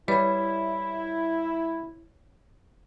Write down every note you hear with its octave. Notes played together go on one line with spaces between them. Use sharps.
G3 E4 B4 C#5 B5